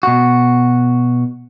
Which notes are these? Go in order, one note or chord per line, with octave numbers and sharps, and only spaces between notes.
B2 F#4